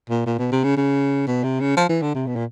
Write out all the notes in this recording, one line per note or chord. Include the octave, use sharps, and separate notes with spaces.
A#2
A#2
B2
C3
C#3
C#3
B2
C3
C#3
F3
E3
D3
C3
B2
A#2